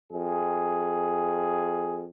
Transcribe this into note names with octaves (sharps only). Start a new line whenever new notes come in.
F2 G#4